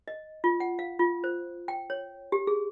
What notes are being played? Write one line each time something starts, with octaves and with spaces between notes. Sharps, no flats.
D#5
F4
F#5
F5
F4
C5
G5
C#5
G4
G#4